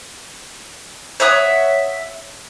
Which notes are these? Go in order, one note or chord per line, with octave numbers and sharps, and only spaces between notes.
C#5 E5 F#5 D#6